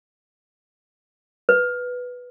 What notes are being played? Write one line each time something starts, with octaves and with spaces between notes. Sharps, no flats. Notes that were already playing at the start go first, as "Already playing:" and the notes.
B4